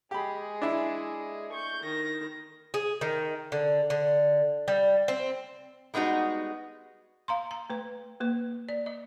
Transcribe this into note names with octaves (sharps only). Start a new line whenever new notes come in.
G#3 G4 G#4 B5
D4 E4
C#6 G6
D#3 A#6
G#4
D#3
D3
D3
G3
C4
G3 G#3 B3 D#4 F#4
F5 A#5 C6
A#5
A3 B4
A#3 B4
D5
D#5